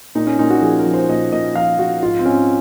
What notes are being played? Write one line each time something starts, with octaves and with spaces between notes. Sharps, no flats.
A#2 D#4
C#4
A#2 D#4
F#4
F3 G#4
A#4
F3
C5
A#2 D#5
A#2 D#5
F3 F5
F3 F#4
G#2 F4
C4
G#2 C#4